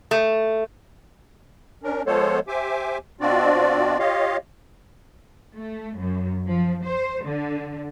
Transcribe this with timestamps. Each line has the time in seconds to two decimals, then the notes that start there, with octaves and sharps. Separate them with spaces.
0.11 A3
1.83 C#4 D4 A#4
2.06 F3 G#3 B3 A4 C5 C#5
2.48 G4 C5 E5 G#5 D6
3.20 B2 C4 D4 F4 F#4 D5
3.99 F4 G4 C#5 D#5 F5
5.56 A3
5.99 F#2
6.47 F3
6.85 C5
7.25 D3